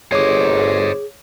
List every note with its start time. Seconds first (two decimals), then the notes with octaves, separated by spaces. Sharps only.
0.12 G1 G#4 C5 C#5 D#5 D6